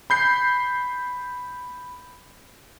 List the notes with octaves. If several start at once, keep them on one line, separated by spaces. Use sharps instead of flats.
B5 G6 C7